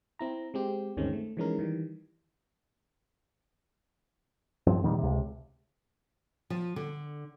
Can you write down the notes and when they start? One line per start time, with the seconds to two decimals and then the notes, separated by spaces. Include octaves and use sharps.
0.19 C4 E4 A#5
0.54 G#3 C4 G4
0.97 D2 G2 D#3 G#3 C4 C#4
1.13 A3
1.37 E3 F3 G#3 C#4 D#4 A#4
1.59 D#3 E3 G3
4.67 G2 F3 C4
4.83 E2 A#2 D#3 G3
4.99 C#2 C3
6.50 F3
6.76 D3